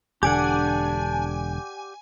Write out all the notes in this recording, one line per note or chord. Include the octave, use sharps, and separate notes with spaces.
E1 D3 D4 G4 D5 F#5 G#5